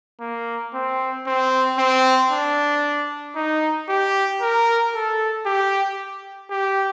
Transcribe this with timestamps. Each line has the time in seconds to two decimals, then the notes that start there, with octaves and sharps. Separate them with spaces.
0.21 A#3
0.74 C4
1.27 C4
1.78 C4
2.31 D4
3.35 D#4
3.89 G4
4.42 A#4
4.94 A4
5.46 G4
6.51 G4